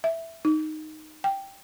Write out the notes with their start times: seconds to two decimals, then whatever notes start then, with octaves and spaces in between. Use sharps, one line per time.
0.04 E5
0.45 D#4
1.24 G5